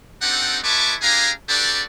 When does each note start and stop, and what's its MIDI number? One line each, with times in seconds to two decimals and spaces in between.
0.22 0.58 60
0.22 0.58 62
0.22 0.58 63
0.22 0.58 67
0.22 0.58 69
0.22 0.58 78
0.63 0.94 56
0.63 0.94 64
0.63 0.94 71
0.63 0.94 81
0.63 0.94 85
0.63 0.94 86
1.01 1.30 62
1.01 1.30 67
1.01 1.30 68
1.01 1.30 77
1.01 1.30 80
1.01 1.30 82
1.48 1.83 62
1.48 1.83 66
1.48 1.83 67
1.48 1.83 69
1.48 1.83 71
1.48 1.83 74